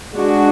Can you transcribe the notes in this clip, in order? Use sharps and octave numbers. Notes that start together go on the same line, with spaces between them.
G#3 D4 F#4